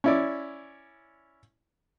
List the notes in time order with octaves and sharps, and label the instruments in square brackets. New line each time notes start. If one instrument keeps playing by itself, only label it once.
[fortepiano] C#4 E4 D5